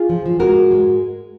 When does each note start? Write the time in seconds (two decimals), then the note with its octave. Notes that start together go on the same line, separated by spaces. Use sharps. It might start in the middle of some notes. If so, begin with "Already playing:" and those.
Already playing: F4 G#4
0.10 F3
0.26 F3
0.40 G#3 F#4 A#4
0.55 G#2
0.71 G#3